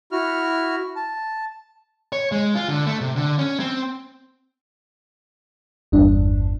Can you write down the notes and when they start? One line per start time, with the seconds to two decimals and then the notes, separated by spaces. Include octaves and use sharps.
0.12 E4 F#4 F6
0.96 A5
2.13 C#5
2.32 G#3
2.55 F4
2.68 D3
2.86 A3
3.01 C3
3.16 D3
3.39 C#4
3.60 C4
5.92 G1 E2 G2 D4